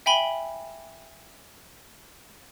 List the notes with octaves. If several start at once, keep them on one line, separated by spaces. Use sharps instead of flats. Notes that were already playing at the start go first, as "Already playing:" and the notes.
E5 G5 G#5 B5 G7